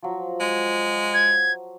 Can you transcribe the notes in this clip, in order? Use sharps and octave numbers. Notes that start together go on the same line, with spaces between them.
F3 F#3
G#3
G#6